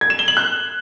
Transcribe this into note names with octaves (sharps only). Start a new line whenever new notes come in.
G#6
E7
G7
F#7
F#6